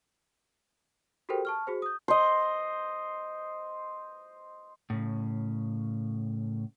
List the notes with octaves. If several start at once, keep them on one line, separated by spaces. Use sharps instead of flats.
F#4 G4 A4 A#4 C5 G5
A5 C#6 F6
F#4 G#4 C5
D#6 G6
C5 D#5
A2 C#3